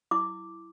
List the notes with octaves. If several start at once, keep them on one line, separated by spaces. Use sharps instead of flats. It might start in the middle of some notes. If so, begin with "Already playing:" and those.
E4 D6